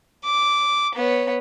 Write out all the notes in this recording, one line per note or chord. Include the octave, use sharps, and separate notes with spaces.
D6
B3 C#5